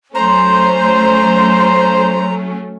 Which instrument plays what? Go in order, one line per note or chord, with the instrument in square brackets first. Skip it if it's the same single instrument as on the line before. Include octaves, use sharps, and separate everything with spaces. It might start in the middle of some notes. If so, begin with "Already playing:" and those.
[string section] F#3 A3 C#4 [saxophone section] C5 [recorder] A#5